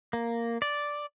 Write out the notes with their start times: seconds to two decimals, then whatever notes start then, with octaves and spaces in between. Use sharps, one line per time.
0.13 A#3
0.62 D5